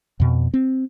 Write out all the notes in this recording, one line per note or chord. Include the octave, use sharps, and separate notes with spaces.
F2 B2
C4